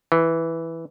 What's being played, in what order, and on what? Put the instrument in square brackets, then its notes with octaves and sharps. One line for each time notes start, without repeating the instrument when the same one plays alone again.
[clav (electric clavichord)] E3